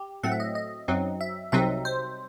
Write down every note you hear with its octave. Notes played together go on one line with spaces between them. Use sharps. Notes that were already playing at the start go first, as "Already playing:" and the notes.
Already playing: G4
A2 F#3 A3 C4 F#5
E5
D#5
D#5
F#2 F#3 C4 D#4
E5
C2 C3 F#3 C4 D#4 E5
C5